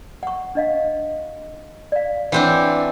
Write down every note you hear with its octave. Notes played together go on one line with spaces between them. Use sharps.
F#5 C#6
D4 D#5 F5
D5 F5
E3 C4 D4 C5 F#5